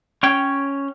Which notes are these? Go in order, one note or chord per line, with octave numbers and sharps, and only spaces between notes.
C#4 C#5 G5